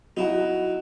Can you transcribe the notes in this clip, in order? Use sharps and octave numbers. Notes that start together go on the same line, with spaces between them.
F#3 D#4 E4 F#5